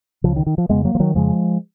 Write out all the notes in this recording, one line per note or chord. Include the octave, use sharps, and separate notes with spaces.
C#2 C#3 F3
D#3
D#3
F3
F2 C#3 G#3 B3
F#3 A#3
F3
D#3 F#3
F2 C#3 F3 G#3